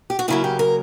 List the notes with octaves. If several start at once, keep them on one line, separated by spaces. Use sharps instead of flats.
G4
F#4
C#3 F#3 A#3 E4
G4
A#4